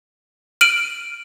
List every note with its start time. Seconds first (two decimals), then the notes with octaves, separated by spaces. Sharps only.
0.61 F6 D7 D#7 F#7